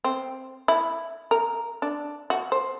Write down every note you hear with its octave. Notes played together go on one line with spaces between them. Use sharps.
C4
E4
A#4
D4
F#4
C5